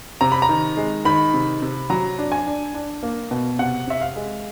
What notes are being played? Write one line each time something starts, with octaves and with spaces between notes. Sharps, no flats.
C3 A#5
B5
A#5
D#3
G#3
D#3 B5
C3
C3
F#3 A#5
D4
G#5
D4
D4
A#3
B2
C3 F#5
C3 E5
F5
G#3